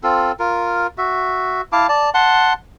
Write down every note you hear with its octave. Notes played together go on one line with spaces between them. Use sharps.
C4 F4 A4
F4 A#4
F#4 E5
E4 F5 A5 D6
D5 A5
F#5 A5 C6